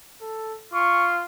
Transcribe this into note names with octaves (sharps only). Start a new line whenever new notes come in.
A4
F4 C#6